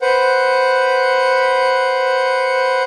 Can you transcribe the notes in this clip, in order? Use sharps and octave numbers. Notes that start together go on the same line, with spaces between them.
B4 C5 F#5